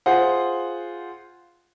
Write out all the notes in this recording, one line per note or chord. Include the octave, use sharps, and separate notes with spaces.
F4 G#4 C5 F#5